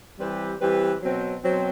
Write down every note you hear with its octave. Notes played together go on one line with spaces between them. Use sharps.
E3 G3 C4 G4 B4
E3 G3 C4 G4 B4
B2 F#3 C4
B2 F#3 C4